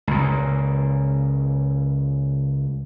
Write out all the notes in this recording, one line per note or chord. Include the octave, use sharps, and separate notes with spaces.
C#2 A#2